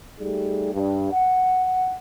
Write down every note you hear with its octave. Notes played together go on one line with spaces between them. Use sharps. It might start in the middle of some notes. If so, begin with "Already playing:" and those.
G3 A3 D#4 G4 G#4
G2
F#5